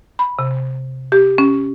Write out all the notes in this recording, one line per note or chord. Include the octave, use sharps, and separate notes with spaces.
B5
C3
G4
C#4